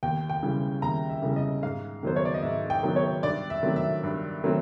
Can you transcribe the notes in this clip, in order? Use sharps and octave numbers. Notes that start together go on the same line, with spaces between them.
D#2 G5
G5
C#3 E3 G3
D#2 A#5
E5
C#3 E3 G3
D#5
G#2 F5
D#3 F#3 B3 C5
C#5
D5
D#5
G#2 E5
G5
D#3 F#3 B3
C#5
G2 D5
E5
D#3 F#3 A3 C4
E5
G2
D#3 F#3 A3 C4